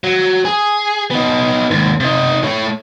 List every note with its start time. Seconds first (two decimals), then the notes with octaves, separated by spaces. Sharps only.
0.04 F#3
0.45 G#4
1.11 B3 D#4
1.71 D#2 G#2
2.00 C3 D#4
2.44 A3 C#5